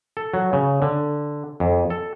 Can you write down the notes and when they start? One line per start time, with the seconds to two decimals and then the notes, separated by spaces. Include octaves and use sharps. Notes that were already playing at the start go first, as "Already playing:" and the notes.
0.17 A4
0.34 F#3
0.53 C#3
0.82 D3
1.60 F2
1.90 A4